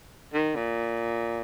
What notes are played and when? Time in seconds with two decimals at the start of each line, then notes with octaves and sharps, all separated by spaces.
0.34 D#3
0.55 A#2